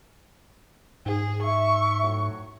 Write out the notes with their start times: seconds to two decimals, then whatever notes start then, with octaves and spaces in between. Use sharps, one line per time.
1.06 G#2 G#4
1.43 E5 C#6
2.02 A2 F#3